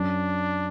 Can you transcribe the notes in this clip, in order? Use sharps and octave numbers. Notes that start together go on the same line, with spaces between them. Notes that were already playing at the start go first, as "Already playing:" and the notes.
Already playing: F#2 D4